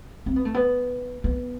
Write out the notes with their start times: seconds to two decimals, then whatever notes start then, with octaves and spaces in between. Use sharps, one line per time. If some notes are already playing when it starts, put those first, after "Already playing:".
0.26 C4
0.36 B3
0.45 A3
0.54 B3
1.24 B3